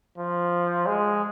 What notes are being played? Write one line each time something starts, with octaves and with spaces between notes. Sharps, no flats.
F3
G#3